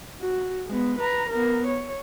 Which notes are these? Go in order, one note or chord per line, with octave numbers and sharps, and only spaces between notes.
F#4
G#3 B3
B4 A#5
B3 A#4
C#5